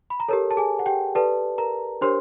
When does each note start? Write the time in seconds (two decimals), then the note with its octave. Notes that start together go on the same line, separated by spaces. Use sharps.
0.10 B5
0.20 A#5
0.29 G4 A4 A#4 C#5 A5
0.51 A5
0.57 G#4 G#5
0.79 F#5
0.86 G4 G5
1.15 G4 A4 B4 D5 A5
1.58 A#4 A#5
2.01 D4 G4 A#4 C5 C#5 C6